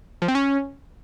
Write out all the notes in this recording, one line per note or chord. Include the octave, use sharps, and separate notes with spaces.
F3
C4
C#4